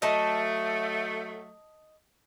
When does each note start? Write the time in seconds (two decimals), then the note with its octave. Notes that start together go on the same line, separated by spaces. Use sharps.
0.02 F#3 A3 D#5 A5